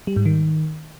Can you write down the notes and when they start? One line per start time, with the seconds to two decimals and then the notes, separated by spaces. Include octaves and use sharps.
0.07 G3
0.16 G#2
0.25 D#3